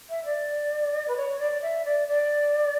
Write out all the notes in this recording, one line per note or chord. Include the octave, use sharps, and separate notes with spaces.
E5
D5
B4
C#5
D5
E5
D5
D5